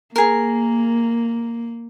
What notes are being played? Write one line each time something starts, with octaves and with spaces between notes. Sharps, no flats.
A#3 G#4 A#4